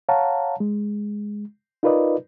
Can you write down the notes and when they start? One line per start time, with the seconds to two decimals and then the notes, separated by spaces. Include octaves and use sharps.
0.09 C#5 F5 F#5 A5 A#5
0.60 G#3
1.83 D#4 F4 A#4 B4 D5 D#5